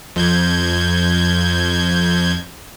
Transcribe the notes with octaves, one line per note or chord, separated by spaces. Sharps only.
F2 G6 G#6